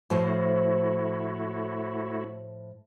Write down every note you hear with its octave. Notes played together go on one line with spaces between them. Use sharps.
A2 F3 A3 E4 F#4 C5